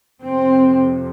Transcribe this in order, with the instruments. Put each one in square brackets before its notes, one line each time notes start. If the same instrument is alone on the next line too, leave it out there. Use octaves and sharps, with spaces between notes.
[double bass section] F2 C3 C4